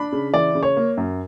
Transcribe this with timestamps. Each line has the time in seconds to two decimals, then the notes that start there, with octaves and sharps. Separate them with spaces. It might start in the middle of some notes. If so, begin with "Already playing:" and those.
Already playing: D4 B5
0.13 C#3
0.34 E3 D5
0.55 C#3
0.63 C#5
0.77 A#3
0.97 F#2